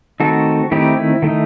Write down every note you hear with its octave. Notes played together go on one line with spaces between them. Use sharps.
D#3 A3 C4 D#4 F#4 A4
D#3 A3 C4 D#4 E4 G4
E4
D#3 A3 D#4